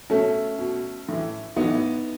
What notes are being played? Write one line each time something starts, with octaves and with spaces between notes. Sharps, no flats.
B2 A3 C#4
B2
A2 E3
A2 B3 D#4
E3